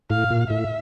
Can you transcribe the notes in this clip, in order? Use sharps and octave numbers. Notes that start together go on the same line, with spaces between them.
A2 F5
A#2
A2 E5